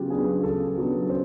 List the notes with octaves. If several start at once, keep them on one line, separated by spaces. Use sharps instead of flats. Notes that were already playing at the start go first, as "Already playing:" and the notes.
Already playing: C#3 F#3 B3 F4 G4
F#3 B3 D4 G#4
C#3 A4
F#3 B3 D4
C#3 C5